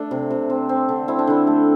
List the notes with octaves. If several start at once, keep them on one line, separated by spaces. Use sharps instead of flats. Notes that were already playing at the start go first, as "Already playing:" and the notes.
Already playing: A3 D4
C3
C3
C4
C4
D3
C4 E4
D4
D3 E4
A3